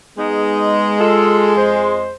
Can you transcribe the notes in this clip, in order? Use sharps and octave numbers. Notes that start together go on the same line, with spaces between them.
G#3 B3 D#4
F4 A4
F2 C5